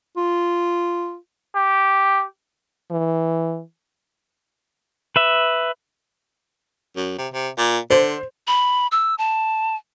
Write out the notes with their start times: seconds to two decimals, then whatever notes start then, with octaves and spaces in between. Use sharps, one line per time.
0.17 F4
1.55 G4
2.91 E3
5.16 B4 E5
6.96 F#2
7.19 C3
7.34 C3
7.58 A#2
7.90 D3 C5
8.47 B5
8.92 E6
9.18 A5